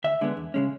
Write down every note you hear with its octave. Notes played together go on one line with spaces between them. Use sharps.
D2 E5
D3 G#3 B3
E2
C#3 G#3 C#4